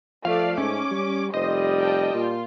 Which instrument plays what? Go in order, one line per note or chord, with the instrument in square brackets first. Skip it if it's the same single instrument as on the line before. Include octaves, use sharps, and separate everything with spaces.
[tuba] F3 [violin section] A3 D5 [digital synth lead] F5
[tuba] G#2 [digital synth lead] C#4 [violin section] D6
[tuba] G3
[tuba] F1 [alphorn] G3 [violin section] C5 [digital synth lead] D#5
[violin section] F5 G5 A5
[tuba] A#2 [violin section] F4